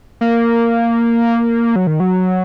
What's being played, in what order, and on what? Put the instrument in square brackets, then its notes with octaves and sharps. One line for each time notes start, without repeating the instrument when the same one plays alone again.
[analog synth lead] A#3
F#3
D#3
F#3